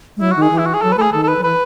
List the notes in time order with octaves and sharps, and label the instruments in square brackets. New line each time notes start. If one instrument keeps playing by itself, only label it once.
[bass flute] G#3
[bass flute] F#3 [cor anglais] E4
[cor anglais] F#4
[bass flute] D#3
[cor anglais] G#4
[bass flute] E3
[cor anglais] E4
F#4
G#4
[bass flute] F#3 [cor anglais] A4
[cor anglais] B4
[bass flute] A3 [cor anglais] A4
[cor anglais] G#4
[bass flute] D#3 [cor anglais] A4
[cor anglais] A4
B4
[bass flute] F#3
[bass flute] E3 [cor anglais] B4